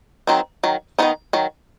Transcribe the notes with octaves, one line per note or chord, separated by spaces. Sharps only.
D#3 F#3 C4 D#4
D#3 F#3
D#3 F#3 B3 D#4
D#3 F#3